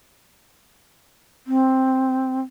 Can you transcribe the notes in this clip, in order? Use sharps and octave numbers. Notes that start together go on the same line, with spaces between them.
C4